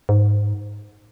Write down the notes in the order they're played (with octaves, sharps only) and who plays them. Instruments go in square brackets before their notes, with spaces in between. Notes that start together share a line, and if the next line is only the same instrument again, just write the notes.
[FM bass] G#2